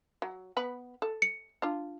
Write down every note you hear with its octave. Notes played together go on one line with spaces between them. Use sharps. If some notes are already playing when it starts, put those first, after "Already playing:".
F#3
B3 B4 B5
A4
C#7
D4 F4